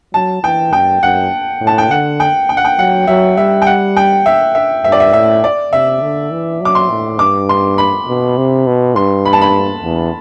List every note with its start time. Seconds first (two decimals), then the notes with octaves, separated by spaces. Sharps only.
0.14 F#3 A5
0.43 E3 G5
0.73 F#2 G5
1.02 F#2 F#5
1.61 A2
1.67 A5
1.78 G5
1.90 D3 F#5
2.20 G5
2.49 G5
2.57 F#5
2.65 G5
2.79 F#3 F#5
3.07 F#3 E5
3.37 G3 E5
3.62 G5
3.67 F#5
3.97 G5
4.26 E5
4.55 E5
4.84 G2 E5
4.92 D5
5.00 E5
5.13 A2 E5
5.44 D5
5.73 C3 E5
6.02 D3
6.31 E3
6.61 F#3 D6
6.75 C6
6.90 A2
7.19 G2 D6
7.49 C6
7.78 B5
8.08 B2
8.37 C3
8.67 B2
8.96 G2 C6
9.26 B5
9.33 A5
9.41 B5
9.84 E2